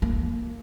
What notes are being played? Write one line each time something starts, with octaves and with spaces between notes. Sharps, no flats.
A#3